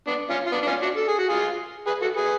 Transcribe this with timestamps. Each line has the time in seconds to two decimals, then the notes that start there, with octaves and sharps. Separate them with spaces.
0.07 B3 D4
0.30 C#4 F4
0.47 F4
0.52 B3 D4
0.63 D4
0.67 C#4 F4
0.82 D4 F#4
0.97 A4
1.08 G#4
1.18 F#4
1.29 F4 G#4
1.87 G#4 B4
2.02 F#4 A4
2.17 G#4 B4